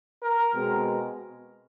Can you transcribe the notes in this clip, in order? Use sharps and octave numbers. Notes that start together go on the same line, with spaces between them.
A#4
B2 G#3 C4